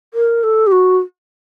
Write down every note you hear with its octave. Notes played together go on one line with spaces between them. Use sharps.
A#4
A4
G4
F#4